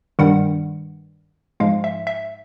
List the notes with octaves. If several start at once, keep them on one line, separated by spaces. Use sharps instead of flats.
G2 D#3 G3 F#5
G#2 F3 G#3 F5
E5
E5